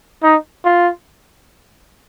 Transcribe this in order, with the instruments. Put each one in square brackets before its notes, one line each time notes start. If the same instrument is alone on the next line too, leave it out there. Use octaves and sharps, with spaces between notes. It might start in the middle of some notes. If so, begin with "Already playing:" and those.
[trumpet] D#4
F4